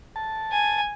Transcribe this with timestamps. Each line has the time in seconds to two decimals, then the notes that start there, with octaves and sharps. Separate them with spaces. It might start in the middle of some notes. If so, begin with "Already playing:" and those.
0.16 A5
0.52 G#5